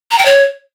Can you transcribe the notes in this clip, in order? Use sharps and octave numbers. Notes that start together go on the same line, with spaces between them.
A#5
G5
C#5